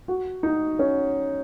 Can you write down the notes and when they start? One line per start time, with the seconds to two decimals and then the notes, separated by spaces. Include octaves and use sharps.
0.08 F#4
0.43 D#4
0.79 C#4